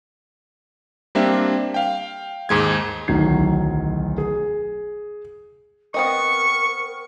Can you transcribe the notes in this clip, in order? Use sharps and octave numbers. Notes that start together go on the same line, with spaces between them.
G3 A#3 C4 D4 E5
F5 G5
D#2 G#2 G#3 G#6
D1 B1 D#3 F#3 G#6 C7
G#4
B3 C4 A#4 D#5 C#6